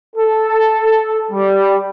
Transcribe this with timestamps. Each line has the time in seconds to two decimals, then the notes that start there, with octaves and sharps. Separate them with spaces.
0.16 A4
1.32 G3